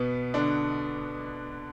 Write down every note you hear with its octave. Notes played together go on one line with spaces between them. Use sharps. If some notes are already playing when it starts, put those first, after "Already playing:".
Already playing: B2 B3
D3 D4